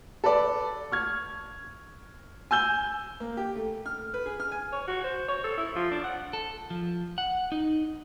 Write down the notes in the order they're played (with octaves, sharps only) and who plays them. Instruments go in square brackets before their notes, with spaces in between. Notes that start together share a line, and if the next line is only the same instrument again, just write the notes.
[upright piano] A4 B4 D5
C#6 F6 G#6
G#5 E6 G6 G7
[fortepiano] A#3
G4
A3
F6
B4
G#4
F6
G#5
[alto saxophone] C#5
F#4
C5
C#5
A4
E4
F3
D4
F#5
[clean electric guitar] A4
F3
F#5
D#4